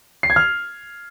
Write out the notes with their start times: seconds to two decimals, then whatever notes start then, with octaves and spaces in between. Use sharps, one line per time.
0.23 C7
0.30 G#6
0.36 F6